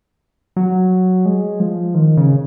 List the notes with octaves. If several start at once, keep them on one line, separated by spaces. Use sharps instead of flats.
F#3
G#3
F3
D#3
C#3